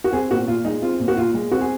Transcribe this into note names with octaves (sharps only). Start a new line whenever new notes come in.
F#4
C4 G#4
A#2 F#4
A#2 F4
G#3 D#4
C4 F4
A#2
F#4
A#2 F4
G#3
C4 F#4
G#4